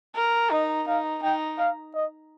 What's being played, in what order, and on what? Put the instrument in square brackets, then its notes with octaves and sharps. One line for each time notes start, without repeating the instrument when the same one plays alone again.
[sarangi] A#4
[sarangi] D#4 [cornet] D#5
[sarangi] D#4 [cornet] F5
[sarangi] D#4 [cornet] G5
[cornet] F5
D#5